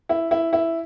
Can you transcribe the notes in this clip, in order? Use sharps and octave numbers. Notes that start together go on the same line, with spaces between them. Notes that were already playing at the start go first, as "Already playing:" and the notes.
E4
E4
E4